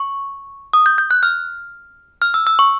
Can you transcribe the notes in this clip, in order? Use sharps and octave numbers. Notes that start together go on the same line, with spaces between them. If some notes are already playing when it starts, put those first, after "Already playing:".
Already playing: C#6
D#6
G6
G6
F#6
F6
F6
E6
E6
C#6